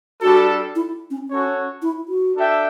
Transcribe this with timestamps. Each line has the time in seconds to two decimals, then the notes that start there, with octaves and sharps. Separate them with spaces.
0.22 G3 D4 F#4 A4
0.76 E4
1.11 C#4
1.28 C#4 F#4 A4 C#5
1.82 E4
2.09 F#4
2.36 D4 A4 E5 G5